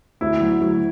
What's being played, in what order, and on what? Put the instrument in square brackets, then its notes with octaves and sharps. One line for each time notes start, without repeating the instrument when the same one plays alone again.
[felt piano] D2 [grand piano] E4
[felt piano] F#3
D2